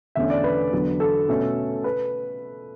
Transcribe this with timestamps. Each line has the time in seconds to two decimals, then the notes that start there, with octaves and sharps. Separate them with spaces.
0.15 E2 D3 A3 C#4 E5
0.30 D5
0.44 B4
0.73 E2 D3 F#3
1.00 A4
1.28 B2 A3 C#4
1.84 B4